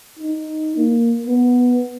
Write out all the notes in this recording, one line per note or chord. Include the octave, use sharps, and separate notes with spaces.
D#4
A#3
B3